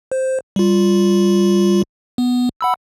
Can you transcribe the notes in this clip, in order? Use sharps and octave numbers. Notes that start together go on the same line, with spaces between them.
C5
G3 F4
B3
F#5 B5 E6